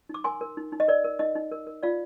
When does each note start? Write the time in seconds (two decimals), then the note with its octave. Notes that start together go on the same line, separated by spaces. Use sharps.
0.09 D#4 D6
0.24 A#4 G#5 C6
0.41 A#4
0.57 D#4
0.72 D#4
0.80 D#5
0.88 A#4 D5
1.04 A#4
1.19 D#4 D#5
1.36 D#4
1.52 A#4
1.67 A#4
1.83 F4 D5 F5